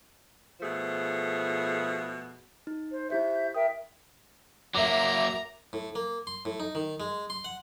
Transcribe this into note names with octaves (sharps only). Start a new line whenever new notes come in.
B2 F3 A3 G#4
D#4
C5
E4 G4 C5 E5 G6
A#4 E5 G5 D#6
F#3 A#3 A#4 E5 A#5 D6
A2
A#3
C6
A2
D#4
D#3
G#3
C6
F#5